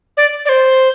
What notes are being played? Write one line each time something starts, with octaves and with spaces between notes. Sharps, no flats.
D5
D5
C5